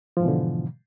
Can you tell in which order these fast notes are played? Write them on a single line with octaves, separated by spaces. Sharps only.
F3 G#2 E3 B2 D3